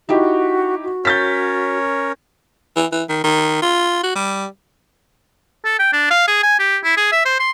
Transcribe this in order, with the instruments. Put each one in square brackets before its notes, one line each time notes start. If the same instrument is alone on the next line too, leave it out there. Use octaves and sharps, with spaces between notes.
[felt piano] D#4 E4 G4 [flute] F#4
[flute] F#4
[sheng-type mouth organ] C#4 A#4 C#5 [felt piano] G6 A6 B6
[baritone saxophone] E3
E3
D#3
D#3
F4
F#4
G3
[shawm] A4
G5
D4
F5
G#4
G#5
G4
E4
G#4
E5
C5
C6